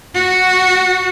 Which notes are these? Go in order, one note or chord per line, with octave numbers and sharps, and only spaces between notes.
F#4